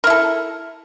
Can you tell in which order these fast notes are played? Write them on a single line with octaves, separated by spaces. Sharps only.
A#4 E4 A4